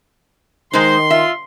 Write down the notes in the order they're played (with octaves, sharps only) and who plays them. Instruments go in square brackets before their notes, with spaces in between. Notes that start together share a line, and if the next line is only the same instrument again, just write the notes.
[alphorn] D#3 [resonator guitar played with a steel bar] G#3 D#4 [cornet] C5 [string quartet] C6
[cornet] F4 [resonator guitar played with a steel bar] E5